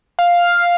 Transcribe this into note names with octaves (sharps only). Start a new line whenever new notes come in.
F5